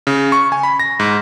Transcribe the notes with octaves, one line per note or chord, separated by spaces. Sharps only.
C#3
C#6
G#5
B5
A#6
G#2